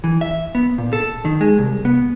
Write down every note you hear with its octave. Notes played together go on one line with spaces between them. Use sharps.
E3
E5
B3
A#2
A4
D#3
G#3
C2
B3